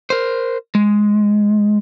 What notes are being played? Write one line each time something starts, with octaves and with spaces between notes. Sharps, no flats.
A#4 C5
G#3